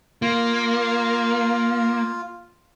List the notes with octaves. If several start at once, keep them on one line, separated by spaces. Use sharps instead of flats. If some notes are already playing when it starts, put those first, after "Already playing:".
A#3 F4